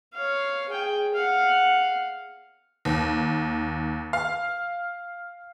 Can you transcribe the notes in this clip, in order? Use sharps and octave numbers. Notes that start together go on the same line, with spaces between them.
C#5 F5
G#4 G5
F5 F#5
D#2
F5